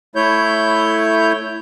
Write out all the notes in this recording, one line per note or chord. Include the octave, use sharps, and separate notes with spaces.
A3 E4 C#5 G6